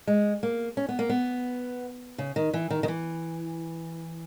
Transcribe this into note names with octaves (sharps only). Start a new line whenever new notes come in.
G#3
A#3
C#4
B3
A#3
B3
C#3
D#3
E3
D#3
D#3
E3